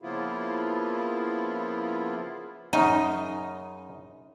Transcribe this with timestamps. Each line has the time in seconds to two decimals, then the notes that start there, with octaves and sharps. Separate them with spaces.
0.02 C#3 F3 A#3 B3 E4 F4
2.73 F#2 C#3 D#4 D#5